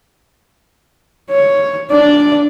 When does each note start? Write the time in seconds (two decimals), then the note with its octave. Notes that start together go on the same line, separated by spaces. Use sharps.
1.31 C#5
1.91 D4 D5